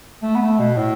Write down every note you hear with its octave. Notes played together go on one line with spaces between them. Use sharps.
A3
B3
A3
B2
A2